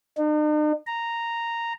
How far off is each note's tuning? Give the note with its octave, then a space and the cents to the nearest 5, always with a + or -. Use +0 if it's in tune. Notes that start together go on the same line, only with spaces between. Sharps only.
D#4 -45
A#5 -5